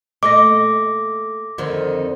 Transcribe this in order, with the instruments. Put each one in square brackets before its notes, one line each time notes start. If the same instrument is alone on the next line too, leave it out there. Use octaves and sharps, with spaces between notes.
[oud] A#2 A3 D#5 [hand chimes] D6 A#6
[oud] F2 D3 D#3